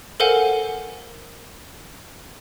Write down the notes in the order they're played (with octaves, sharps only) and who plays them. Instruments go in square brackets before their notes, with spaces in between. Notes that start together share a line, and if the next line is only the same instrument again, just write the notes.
[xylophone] A4 A#4 C5 F5 F#5 G#5